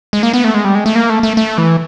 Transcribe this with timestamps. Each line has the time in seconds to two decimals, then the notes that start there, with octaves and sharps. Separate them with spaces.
0.13 G#3
0.23 A#3
0.34 B3
0.44 A3
0.54 G#3
0.65 G3
0.75 G#3
0.86 A3
0.95 A#3
1.09 A3
1.23 A3
1.37 A3
1.58 E3